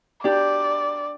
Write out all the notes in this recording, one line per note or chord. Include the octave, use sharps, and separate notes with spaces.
D4 G4 D5